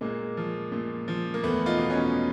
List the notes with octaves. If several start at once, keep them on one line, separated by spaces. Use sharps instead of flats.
A#2 G#3 A#3
F3
A#2
F3
A#3
E2 A3 B3
D#4 F4
B2
C#4 D#4